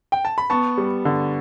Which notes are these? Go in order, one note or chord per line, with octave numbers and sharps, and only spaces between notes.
G5
A5
B5
B3 A5 C#6
G3
D3